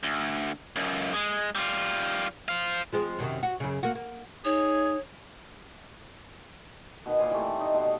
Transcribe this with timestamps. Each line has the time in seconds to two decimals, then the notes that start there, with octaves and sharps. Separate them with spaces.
0.03 D2
0.76 C#2 F#2
1.14 G#3
1.55 G3 F4
2.48 C5 F5
2.93 F3 G#3 C4
3.19 F#2 C3 D#3
3.43 F#4
3.60 F#2 C#3
3.83 A#3 F#4
3.95 A#3
4.45 D#4 G#4 C#5
7.06 B2 D#3 B3
7.18 A#2 C5 G#5
7.31 E3 G3 A3 C4
7.60 D#4
7.74 B2 A4 C6